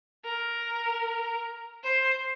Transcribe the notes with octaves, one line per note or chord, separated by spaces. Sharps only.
A#4
C5